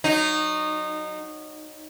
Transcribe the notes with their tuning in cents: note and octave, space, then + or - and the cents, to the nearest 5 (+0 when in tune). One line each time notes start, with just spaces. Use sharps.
F#3 +0 D#4 -20